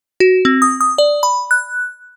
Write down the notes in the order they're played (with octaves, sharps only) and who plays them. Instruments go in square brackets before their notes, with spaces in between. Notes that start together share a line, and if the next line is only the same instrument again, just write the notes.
[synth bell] F#4
C4
D#6
D#6
D5
B5
F#6